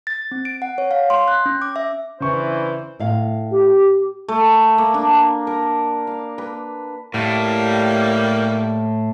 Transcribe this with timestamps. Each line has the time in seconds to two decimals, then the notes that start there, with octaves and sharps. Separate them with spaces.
0.07 A6
0.31 C4
0.45 D7
0.62 F#5
0.78 C#5
0.91 F5
1.10 C6
1.28 F#6
1.46 C#4
1.62 D6
1.76 E5
2.20 C#3 E3 D4 E4 C5 C#6
2.99 A2 F5
3.51 G4
4.28 A3
4.78 A#3
4.94 D4
5.47 A#4
6.07 F5
6.38 B4
7.14 A2 G3 A#3